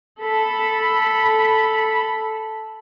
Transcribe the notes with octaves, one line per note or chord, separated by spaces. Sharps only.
A4 B5